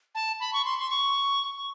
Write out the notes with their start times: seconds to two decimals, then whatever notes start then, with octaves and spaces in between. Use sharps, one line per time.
0.15 A5
0.40 B5
0.53 C#6
0.65 C6
0.79 C6
0.90 C#6